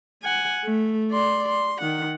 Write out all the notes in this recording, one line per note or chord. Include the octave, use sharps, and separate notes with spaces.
F#5 G#5
A3
D5 C6
C6
D#3 F#5